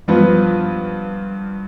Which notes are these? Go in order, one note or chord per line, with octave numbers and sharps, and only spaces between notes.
G2 F3 B3 F4 B4